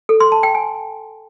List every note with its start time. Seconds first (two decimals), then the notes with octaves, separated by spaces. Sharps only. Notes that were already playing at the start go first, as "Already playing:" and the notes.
0.09 A4
0.20 C6
0.32 A5
0.43 G5
0.55 G#5